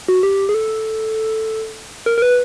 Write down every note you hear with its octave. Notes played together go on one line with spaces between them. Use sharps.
F#4
G4
G#4
A4
A#4
A#4
B4